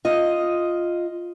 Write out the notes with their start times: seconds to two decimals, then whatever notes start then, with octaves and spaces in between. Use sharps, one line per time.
0.05 F4 D#5